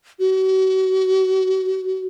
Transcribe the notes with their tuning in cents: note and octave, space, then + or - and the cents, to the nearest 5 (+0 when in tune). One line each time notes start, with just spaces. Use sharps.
F#4 +35